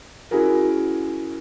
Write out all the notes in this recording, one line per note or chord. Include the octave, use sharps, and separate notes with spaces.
C#4 E4 F#4 G#4 A#4